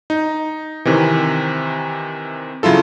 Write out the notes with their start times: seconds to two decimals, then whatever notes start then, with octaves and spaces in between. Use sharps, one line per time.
0.10 D#4
0.85 C3 D#3 E3
2.63 C#3 F#3 E4 F4 A4